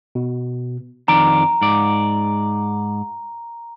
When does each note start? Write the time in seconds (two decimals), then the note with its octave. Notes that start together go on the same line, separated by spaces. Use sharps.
0.15 B2
1.08 F2 D#3 D5 A#5
1.61 G#2 D5